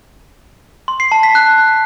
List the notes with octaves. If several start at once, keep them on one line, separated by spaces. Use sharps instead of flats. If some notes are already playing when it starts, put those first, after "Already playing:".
C6
C7
A5
B6
F#6